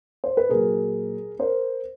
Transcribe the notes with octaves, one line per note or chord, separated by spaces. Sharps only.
C5
B4
A#2 F#3 G#4 A#4
A#4 C5